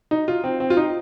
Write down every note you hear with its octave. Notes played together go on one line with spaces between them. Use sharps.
D#4
F4
C4
C4
F4
D#4